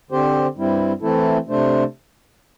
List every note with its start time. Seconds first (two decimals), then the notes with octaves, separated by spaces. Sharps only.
0.11 D3 C4 G4 C5
0.56 G2 G3 C4 E4
1.02 E3 A3 C4 E4 A4
1.48 C3 A3 D4 C5